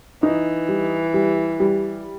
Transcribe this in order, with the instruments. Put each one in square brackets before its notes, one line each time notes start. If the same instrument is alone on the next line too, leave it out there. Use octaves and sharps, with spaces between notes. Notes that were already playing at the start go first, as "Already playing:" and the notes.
[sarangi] E3 [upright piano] D#4
[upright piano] G3
G3
G3